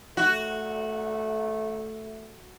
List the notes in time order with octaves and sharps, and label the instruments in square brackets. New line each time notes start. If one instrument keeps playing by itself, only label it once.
[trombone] A3 [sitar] F#4